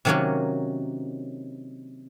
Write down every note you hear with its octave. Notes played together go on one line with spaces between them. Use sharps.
C3 D#3 F#3 A#3 C#4 F#4